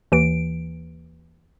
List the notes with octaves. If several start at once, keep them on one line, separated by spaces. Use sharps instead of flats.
D#2 E3 D7